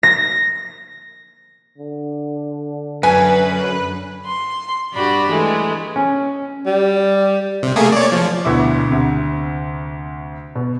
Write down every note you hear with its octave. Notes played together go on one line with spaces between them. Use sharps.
A#6
D3
F#2 B4 G#5
C6
G2 F#4 G4 D5 B5
E3 G#3 A3
C#4
G3
C3
A3 A#3 G#4
C#5 D5
F3
D2 B2 E4 D6
D2 C3
B2